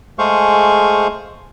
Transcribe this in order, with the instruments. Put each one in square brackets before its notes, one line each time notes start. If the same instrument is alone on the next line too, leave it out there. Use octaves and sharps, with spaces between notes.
[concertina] G#3 A3 G#4 C5 F5 C#6